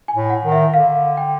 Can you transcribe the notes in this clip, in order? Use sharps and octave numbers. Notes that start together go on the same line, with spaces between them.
G#5
A2
F#5
D#3
E5
D3 F5
G5